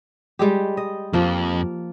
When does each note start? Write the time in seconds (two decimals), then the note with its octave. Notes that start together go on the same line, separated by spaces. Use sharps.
0.39 G3 G#3 G4
0.77 D#5
1.13 F2 F3 A#3